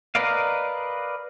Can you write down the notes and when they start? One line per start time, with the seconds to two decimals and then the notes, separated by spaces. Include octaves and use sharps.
0.15 A#4 B4 D5 D#5 F5